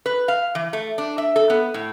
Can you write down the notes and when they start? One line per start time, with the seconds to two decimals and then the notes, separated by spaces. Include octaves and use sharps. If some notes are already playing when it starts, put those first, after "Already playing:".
0.06 B4
0.28 F5
0.55 E3
0.73 A3
0.98 D4
1.18 E5
1.36 A4
1.50 B3
1.74 A2